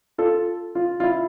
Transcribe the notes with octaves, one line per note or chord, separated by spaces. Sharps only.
F4 A4
F4
F4
E4